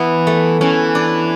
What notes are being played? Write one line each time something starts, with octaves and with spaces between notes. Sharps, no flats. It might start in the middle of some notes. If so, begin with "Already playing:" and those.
Already playing: E3 B3 E4
A3
E3 C#4
D4